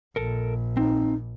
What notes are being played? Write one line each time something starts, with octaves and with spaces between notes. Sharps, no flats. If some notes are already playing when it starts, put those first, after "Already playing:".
A#1 A4 A#4
C4 D#4